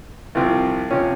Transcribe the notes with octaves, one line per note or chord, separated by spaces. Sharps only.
C2 C3 F3
C3 F3 C#4